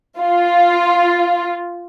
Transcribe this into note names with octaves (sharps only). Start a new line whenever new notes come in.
F4